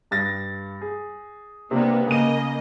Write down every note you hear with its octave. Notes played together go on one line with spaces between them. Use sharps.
G2 A6 A#6
G#4
C3 A#3 B3 D4
C#3 A#3 D#5 D#7